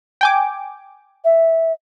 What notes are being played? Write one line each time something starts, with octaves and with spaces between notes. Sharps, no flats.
G5 G#5 D6
E5